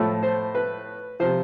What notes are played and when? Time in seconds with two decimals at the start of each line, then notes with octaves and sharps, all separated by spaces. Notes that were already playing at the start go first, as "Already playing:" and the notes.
Already playing: A2 F3 A3
0.23 C5
0.55 B4
1.20 C3 F3 C5